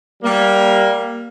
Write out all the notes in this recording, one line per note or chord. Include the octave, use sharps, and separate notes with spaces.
G3 A#3